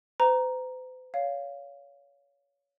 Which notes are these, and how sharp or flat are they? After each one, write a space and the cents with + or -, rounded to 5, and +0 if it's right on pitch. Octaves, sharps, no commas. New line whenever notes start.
C5 -45 A#5 +5
C#5 +30 F5 +0